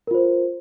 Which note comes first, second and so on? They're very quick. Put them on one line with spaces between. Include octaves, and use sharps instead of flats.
A#4 F4 C5